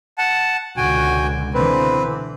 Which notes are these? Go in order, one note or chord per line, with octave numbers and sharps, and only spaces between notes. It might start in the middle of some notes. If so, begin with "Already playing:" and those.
F#5 A5
C#2 B2 D3 F#4 G5 G#5
B2 D3 E3 C4 B4